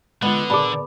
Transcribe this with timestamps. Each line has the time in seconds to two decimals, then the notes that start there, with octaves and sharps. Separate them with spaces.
0.22 D3 G#3 B3 F4
0.50 A#2 G#4 D5 A5 B5